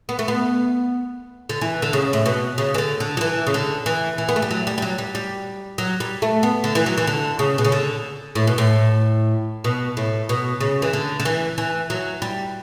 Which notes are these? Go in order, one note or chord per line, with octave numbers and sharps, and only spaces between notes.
B3
A3
B3
D3
E3
D3
C#3
A2
B2
C#3
E3
D3
D3
F#3
E3
C#3
D3
E3
E3
B3
A3
G3
F#3
G3
G3
F#3
G3
G3
F#3
G3
A3
B3
D3
E3
F#3
E3
D3
C#3
B2
C#3
D3
A2
B2
A2
B2
A2
B2
C#3
E3
D3
D3
E3
E3
F#3
G3